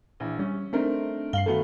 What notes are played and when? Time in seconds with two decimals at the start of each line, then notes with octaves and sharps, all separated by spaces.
0.20 A#1 E3
0.39 G3 C#4
0.73 A3 C4 D4 D#4 A#4 C5
1.33 G2 F5 C7 F#7 G7
1.46 D#3 A3 B3 F#4 A4